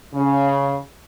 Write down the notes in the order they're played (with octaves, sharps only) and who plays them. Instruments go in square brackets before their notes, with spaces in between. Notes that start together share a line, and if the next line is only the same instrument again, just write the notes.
[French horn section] C#3